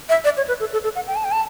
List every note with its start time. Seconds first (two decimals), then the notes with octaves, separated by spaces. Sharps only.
0.09 E5
0.24 D5
0.37 C#5
0.48 B4
0.60 A4
0.73 A4
0.84 A4
0.95 F#5
1.07 G5
1.16 A5
1.24 G5
1.32 A5